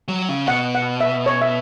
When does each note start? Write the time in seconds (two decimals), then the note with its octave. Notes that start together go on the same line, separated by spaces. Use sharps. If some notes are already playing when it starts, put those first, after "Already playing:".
0.08 F#3
0.29 C#3
0.47 B2 F#5
0.75 F#5
1.01 E5
1.26 C#5
1.41 E5